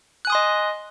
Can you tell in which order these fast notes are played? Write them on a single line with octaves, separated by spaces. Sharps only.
F#6 G#5 D#6 C6 D#5